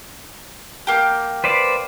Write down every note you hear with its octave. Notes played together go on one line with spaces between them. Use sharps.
A#3 G4
B4 C5 D5